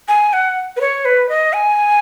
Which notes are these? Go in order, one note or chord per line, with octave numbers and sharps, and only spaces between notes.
G#5
F#5
B4
C#5
B4
D#5
G#5